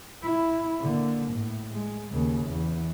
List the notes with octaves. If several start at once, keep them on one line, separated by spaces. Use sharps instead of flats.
E4
D3 A#3
A2
G#3
D#2 C#3
E2